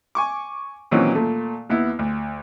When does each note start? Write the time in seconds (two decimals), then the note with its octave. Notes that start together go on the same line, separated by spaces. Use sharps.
0.15 G#5 C#6 D6
0.91 A#2 D#3 E3 F#3 C4 C#4
1.15 A#2 A3
1.70 D#2 B3 E4
1.99 D2